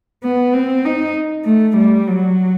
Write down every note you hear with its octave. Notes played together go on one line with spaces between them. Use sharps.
B3
C4
D#4
A3
G3
F#3